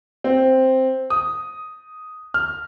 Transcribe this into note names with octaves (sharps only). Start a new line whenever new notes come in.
C4
D#6
F6